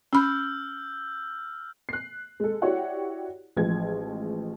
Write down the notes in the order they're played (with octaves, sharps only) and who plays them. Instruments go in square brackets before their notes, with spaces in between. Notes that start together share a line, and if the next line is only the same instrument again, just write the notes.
[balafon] C#4 B5 [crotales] E6 F6 G6
[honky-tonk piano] F#6 C7
G#3 A4
E4 F#4 G4 C#5 D5 F#5
A1 F3 G#3 G#6